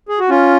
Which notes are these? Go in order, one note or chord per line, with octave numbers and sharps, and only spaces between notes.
G#4
F#4
C#4 F4